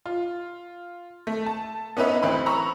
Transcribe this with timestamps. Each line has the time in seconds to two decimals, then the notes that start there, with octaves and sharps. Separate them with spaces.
0.06 F4
1.27 A3
1.46 A5
1.97 B3 C#4 D#4 B4 E5
2.22 D2 E3 C4 B5
2.46 A#5 B5 C#6 E6